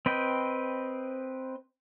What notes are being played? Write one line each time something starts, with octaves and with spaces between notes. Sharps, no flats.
C4 B4 D#5 G5